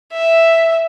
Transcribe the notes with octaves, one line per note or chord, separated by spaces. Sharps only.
E5